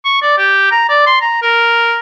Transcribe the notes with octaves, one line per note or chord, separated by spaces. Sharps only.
C#6
D5
G4
A#5
D5
C6
A#5
A#4